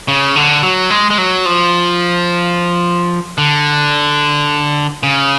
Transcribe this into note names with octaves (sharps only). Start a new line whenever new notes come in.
C#3
D3
F#3
G#3
G#3
F#3
F3
D3
C#3